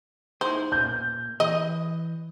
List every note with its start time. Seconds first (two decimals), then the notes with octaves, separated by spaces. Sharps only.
0.41 D#4 E4 G#4 C5
0.72 A#2 G6
1.40 E3 D#5